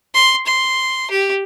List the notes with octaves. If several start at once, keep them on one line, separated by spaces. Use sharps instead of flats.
C6
C6
G4